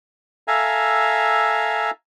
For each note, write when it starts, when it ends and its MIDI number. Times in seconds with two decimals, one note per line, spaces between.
0.48 1.91 69
0.48 1.91 76
0.48 1.91 77
0.48 1.91 80
0.48 1.91 82